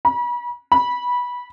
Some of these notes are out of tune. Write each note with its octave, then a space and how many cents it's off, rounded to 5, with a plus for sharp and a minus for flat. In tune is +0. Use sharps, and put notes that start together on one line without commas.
B5 -35
B5 -15